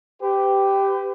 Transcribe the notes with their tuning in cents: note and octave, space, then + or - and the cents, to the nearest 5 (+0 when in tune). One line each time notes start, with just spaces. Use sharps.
G4 +0 B4 +35